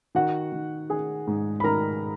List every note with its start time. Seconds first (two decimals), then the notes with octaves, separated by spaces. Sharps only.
0.15 D#3 F#4 F#5
0.52 D#3
0.90 D#3 G#4 G#5
1.27 G#2
1.60 B5
1.64 D#3 A#4 A#5